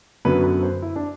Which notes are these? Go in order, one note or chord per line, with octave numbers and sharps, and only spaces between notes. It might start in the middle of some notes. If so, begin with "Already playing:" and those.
F#2 D3 F#3 B3 B4
B4
C5
E4
D4